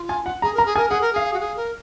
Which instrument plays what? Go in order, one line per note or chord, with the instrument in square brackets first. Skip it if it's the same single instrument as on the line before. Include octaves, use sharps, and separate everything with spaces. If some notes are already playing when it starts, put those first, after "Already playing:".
Already playing: [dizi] F4
[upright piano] G#5
F#5
[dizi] G#4 [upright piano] A#5
[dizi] A#4 [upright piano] A#5
[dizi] G#4
[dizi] A#4 [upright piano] G#5
[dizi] G#4 [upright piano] F#5
[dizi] A#4
[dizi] G#4 [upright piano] F5
[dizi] F#4
G#4
A#4